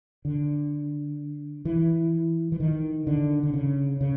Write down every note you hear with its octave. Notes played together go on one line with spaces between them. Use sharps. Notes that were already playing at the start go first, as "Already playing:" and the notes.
D3
E3
E3
D#3
D3
D3
C#3
C#3